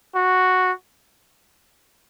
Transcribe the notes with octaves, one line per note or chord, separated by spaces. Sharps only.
F#4